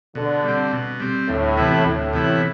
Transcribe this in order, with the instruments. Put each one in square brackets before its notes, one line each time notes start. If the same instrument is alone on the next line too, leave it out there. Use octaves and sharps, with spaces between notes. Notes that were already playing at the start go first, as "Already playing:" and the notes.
[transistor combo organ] B2 [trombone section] D3
[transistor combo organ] G3 C4
B2
G3 C4
[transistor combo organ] D2 [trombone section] A2
[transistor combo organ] C3 E3 B3 E4
[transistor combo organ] D2 [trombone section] A2
[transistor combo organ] C3 E3 B3 E4